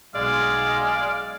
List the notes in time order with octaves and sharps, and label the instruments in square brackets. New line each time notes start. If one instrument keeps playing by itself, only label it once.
[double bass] B1 [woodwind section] G#3 [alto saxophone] D5 [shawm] F5